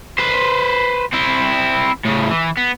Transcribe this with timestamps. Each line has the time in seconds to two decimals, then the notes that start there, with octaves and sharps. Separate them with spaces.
0.18 B4 C5
1.13 C4 E4
2.05 A2 C#3
2.30 E3
2.57 B3